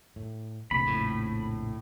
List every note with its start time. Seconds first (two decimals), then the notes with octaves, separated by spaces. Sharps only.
0.16 A2
0.71 A#1 F2 C#3 A3 B5
0.87 A2